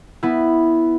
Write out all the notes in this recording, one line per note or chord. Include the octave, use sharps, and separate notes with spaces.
B3 E4